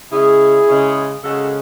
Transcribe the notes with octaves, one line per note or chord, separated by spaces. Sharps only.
C#3 G#3 C#4 E4 G#4
C#3 G#3 C#4
C#3 G#3 C#4 F#4 A4